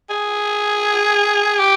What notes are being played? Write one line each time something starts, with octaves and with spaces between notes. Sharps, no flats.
G#4
G4